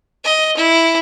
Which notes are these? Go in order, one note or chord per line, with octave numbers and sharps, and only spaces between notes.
D#5
E4